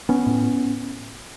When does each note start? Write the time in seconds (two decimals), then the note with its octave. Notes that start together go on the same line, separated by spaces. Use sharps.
0.09 B3 C#4
0.26 A2